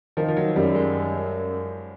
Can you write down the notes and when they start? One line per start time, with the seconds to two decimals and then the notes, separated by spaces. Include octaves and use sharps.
0.17 D#3 F3
0.28 F3
0.36 F#3
0.56 F#2 G3
0.75 G#3